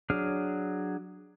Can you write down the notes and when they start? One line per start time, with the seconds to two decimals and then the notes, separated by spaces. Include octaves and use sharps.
0.10 F#3 D4 G#4 F6